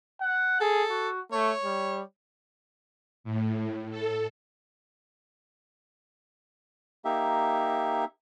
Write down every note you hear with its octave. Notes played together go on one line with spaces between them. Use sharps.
F#5
G#4 A4
F#4
A3 C#5
G3
A2
A4
A#3 D#4 G4 E5